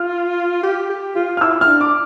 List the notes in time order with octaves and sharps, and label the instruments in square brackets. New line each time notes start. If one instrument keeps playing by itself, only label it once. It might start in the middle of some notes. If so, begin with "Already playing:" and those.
Already playing: [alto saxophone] F4 [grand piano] F6
[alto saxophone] G4
G4
F4
[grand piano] F6
[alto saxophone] E4 [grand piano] E6
[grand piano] F6
[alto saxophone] D4
[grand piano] D6